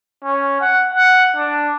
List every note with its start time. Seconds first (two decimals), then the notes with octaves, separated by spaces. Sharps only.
0.24 C#4
0.61 F#5
0.95 F#5
1.37 D4